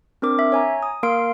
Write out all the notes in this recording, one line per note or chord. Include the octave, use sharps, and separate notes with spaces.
C4 D4 A#4 D6
E5
C#5 G#5 A#5
D#6
A#3 A#4 F5 C6 D7